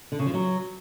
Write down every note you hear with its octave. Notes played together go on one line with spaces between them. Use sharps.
D3
C#3
F3
F#3